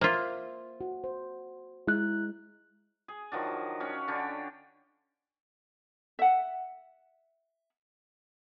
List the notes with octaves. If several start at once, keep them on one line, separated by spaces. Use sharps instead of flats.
A#3 F4 C5 E5
F#4
C5
G#3 E4 F#6
G#4
D#3 F3 F#3 D4
C#4 C#5 F#5
D3 C#4 D4 G5
E5 F#5